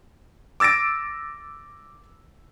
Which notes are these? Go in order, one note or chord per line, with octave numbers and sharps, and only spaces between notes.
D6 E6 A6 A#6 D7